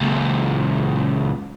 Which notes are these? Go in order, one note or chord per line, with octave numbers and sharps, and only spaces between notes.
C#2 A#2